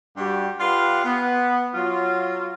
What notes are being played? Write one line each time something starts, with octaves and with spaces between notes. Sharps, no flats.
G2 G3 F#4 G4
F4 G4 B4 D5 F5 F#5
B3
F#3 F4